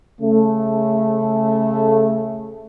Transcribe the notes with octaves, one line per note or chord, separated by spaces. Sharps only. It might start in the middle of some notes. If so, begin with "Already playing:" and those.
C#3 A3